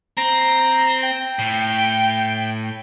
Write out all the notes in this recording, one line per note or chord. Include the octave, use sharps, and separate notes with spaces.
C4 A#5
G5
A2